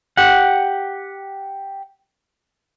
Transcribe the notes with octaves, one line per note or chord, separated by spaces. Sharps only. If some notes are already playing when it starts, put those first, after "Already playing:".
G4 F#5